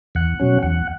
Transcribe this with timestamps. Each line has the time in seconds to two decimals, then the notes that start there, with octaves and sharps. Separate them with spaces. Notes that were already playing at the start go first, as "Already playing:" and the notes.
0.15 E2 F#5
0.39 B2 F#3 C#4
0.63 E2 F#5